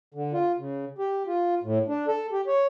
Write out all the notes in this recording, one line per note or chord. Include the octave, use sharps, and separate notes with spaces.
D3
F4
C#3
G4
F4
A2
D4
A4
G4
C#5